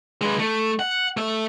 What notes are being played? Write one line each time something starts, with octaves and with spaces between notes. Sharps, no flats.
G#3 B4
A3
F#5
A3 E5